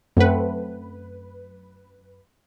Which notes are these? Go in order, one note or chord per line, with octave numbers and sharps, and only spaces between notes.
F#2 A3 C4 B4 F#5